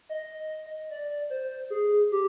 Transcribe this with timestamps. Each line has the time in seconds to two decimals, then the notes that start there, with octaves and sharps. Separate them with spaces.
0.09 D#5
0.90 D5
1.30 C5
1.70 G#4
2.11 G4